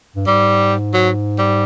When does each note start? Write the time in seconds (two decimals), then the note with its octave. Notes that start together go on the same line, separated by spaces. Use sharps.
0.16 G2
0.27 G#2 G3
0.94 F#3
1.39 G3